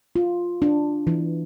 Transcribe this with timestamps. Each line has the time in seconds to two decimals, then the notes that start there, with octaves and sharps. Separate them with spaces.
0.16 F4
0.62 D4
1.07 E3